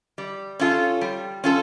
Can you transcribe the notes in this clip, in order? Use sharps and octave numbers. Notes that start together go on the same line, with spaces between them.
G3
C#4 F4 A4
G3
C#4 F4 A4